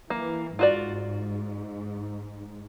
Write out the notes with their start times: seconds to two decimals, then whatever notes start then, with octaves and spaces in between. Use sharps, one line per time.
0.10 E3 A#3
0.59 G#2 F4 F#4 D5